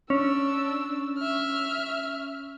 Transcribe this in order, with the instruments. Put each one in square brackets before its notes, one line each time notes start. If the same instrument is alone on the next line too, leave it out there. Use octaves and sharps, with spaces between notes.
[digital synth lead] C#4 [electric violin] D4 E6
[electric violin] E5 F6